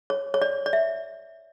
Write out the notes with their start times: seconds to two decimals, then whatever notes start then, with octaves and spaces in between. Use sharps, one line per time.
0.10 C#5
0.34 C#5
0.42 D5
0.66 D5
0.73 E5